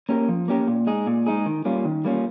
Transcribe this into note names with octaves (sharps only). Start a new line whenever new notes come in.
A#3 C#4 G4 A#4
F3
A#3 C#4 G4 A#4
A#2
G#3 D#4 G#4
A#2
G#3 D#4 G#4
D#3
G3 A#3 C#4 F4
D#3
G3 A#3 C#4 F4